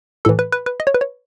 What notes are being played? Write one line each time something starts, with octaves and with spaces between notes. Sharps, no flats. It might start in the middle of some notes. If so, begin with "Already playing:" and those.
A2 E3 A4
B4
B4
B4
D#5
C#5
B4
C#5